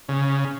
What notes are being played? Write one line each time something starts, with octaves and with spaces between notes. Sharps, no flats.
C#3